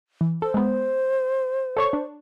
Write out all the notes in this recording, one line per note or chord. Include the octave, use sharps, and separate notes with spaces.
E3
A4 C5
G#3 B3
A4 C#5 C#6
D4